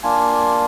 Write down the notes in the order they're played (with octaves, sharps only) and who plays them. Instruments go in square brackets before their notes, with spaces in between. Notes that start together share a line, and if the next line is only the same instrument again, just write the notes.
[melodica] A#3 D4 F4 G#5